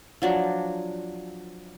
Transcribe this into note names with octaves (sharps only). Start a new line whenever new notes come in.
F3 F#3 D4